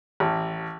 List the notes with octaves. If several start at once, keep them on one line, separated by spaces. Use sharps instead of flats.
A1